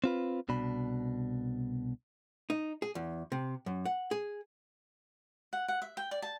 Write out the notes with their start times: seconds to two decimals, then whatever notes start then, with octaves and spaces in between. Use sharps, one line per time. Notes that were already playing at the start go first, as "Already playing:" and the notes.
0.04 C4 F4 B4
0.49 C2 B2 D4 B5
2.50 D#4
2.82 G#4
2.95 E2
3.32 C3
3.66 F#2
3.85 F#5
4.11 G#4
5.53 F#5
5.68 F#5
5.82 E5
5.97 G5
6.11 D5
6.22 A5